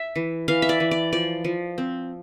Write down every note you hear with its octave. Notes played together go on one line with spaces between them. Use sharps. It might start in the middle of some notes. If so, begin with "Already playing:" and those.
Already playing: E5
E3
E3 F5
E5
D5
E3
D5
F3 D5
F3
C4